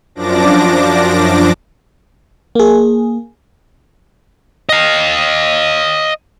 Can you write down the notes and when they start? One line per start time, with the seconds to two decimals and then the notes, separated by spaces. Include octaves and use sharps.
0.15 F#2 F3 D4 D6 A#6
2.55 A#3 G#4
4.69 D#5 F5